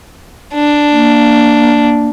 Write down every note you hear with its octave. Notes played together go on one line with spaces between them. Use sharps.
D4
A#3